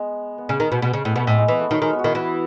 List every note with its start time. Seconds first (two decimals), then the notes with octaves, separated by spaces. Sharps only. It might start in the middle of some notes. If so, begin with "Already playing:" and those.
Already playing: G#3 B3
0.38 B3
0.49 C#3
0.60 D#3
0.72 B2
0.82 B2
0.93 C#3
1.05 A2
1.11 B2 B3
1.19 A3
1.27 A2 G#3
1.38 G#3
1.48 E3 B3
1.60 A3
1.71 D#3 F#3
1.82 D#3 G#3
1.93 B3
1.99 F#4
2.04 D#3 E4
2.15 E3 F#4